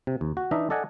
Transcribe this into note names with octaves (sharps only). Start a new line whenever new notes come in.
C3
D#2
F#4
E3 D4 D#4 D#5 E5
A4 D5 D#5 F#5 G#5